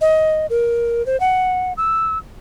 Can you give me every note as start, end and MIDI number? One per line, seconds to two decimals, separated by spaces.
0.01 0.47 75
0.50 1.05 70
1.06 1.19 72
1.20 1.73 78
1.77 2.18 88